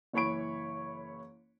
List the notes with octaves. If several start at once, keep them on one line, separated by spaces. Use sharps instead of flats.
F#1 E3 C#5 B5 C#6 D7